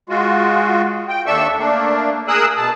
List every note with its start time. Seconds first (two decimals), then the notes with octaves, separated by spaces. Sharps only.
0.09 G#3 F4 F#4
1.09 G5
1.26 D#2 D4 A4 E5 C#6 E6
1.58 A3 A#3 D4
2.28 G#4 A#4 D#6 E6 F#6
2.57 B2 A5